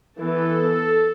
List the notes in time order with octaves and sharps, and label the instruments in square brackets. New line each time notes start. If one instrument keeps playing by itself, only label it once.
[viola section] E3 B3 A4